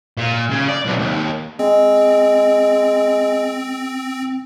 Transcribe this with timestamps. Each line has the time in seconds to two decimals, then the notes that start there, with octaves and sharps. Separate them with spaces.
0.17 A#2
0.51 C#3
0.68 D5
0.85 B1 C3
0.98 D#2
1.59 G#3 C4